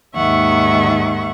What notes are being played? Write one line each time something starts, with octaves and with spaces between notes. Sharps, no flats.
D#2 G#2 D#3 E5 F#5 C#6